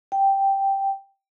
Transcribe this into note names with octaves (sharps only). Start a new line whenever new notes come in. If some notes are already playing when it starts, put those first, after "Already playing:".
G5